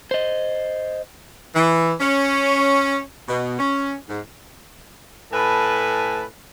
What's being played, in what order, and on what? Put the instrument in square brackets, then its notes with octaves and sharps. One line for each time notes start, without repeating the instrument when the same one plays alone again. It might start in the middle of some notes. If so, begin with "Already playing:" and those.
[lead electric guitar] C5 D#5
[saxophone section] E3
C#4
B2
C#4
G#2
[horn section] A2 A4 B4 G#5 A5 B5